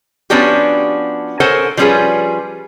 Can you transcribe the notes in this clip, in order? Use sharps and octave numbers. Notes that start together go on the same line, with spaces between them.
F3 B3 C#4 D4 F#4 G4
A4 A#4 C5 C#5 F#5 G#5
F3 G3 C#4 G4 G#4 B4